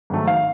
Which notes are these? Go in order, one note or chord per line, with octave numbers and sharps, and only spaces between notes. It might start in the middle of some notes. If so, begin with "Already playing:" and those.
G#2 D#3 F#3 A3
G#1 F5